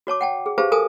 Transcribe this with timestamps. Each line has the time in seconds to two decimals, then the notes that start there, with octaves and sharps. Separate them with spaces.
0.07 F#4 C#5 A5 D6
0.21 F#5 G5 A5
0.46 G#4
0.58 G4 G#4 B4 C5 F5 A5
0.72 A4 A#4 G#5 A5 D#6